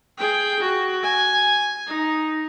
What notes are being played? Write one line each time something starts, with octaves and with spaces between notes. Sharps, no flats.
G#4 G5
F#4
G#5
D#4